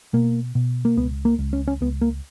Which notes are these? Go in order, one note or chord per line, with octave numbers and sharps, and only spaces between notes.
B2 A#3
B2
A#3
C#2 B3
A#3
C#2
C#4
C#4
C#2 B3
A#3